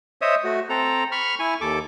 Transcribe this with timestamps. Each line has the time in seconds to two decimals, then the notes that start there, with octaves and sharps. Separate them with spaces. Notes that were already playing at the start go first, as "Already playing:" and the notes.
0.22 C5 C#5 D#5 E5 D#6
0.44 A3 F#4
0.70 C4 A4 A#5
1.12 B5 C#6 F6
1.40 E4 G#5 C#6
1.61 D#2 A4 D6